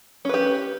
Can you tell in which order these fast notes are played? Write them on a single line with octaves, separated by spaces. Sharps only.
C#4 B4 G4